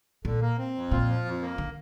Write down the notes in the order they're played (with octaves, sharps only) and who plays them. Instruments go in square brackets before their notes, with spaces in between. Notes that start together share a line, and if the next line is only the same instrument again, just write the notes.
[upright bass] A#2 [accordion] D3
[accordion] A#3
C4
F2
[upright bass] A#2 [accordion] F4
[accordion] F3
F2
A#3
[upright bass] D3